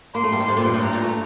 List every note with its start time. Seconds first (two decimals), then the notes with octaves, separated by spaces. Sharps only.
0.15 A#3 C6
0.24 A3
0.32 G3
0.40 D#3
0.48 C3
0.57 A#2
0.65 G2
0.74 A2
0.81 G2 A#5
0.93 A#2
1.04 A3